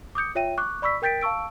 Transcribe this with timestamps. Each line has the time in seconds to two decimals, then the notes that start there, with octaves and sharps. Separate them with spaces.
0.15 D6 D#6 G6 C#7
0.35 F4 C#5 E5 G5 D#7
0.58 C#6 D6 F#6
0.82 D5 B5 C#6 E6 B6
1.02 A#4 G5 G6 A6 B6 D7
1.22 F5 A5 C#6 E6 D7